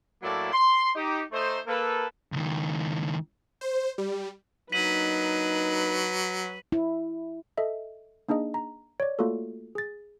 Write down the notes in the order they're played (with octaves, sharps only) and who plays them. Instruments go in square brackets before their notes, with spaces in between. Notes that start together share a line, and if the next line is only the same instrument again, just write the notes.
[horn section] A2 F#3 A3 A#3 E4 D5
C6
D#4 G4
A3 D#4 C5
A#3 A4 B4
[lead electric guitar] C#2 D#3
[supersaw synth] C5
G3
[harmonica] F#3 [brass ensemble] A#3 D4 D#4 [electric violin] B4 [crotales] B6 D#7 F#7
[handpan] E4
[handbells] A4 D#5 E5
A#3 D4 D#4 G#4 D#5
A#5
C#5 D5
A3 A#3 F4 F#4 A4
G#4 A6